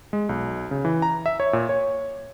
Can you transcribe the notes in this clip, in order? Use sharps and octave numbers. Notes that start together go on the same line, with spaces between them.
G#3
B1
C#3
E3
A#5
E5
C#5
A#2
C#5